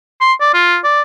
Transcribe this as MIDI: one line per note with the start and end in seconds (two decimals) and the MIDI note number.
0.21 0.33 84
0.40 0.52 74
0.54 0.78 65
0.84 1.02 74